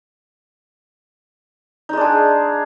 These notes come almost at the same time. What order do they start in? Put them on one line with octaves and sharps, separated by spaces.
D#4 G#3 D4 G#4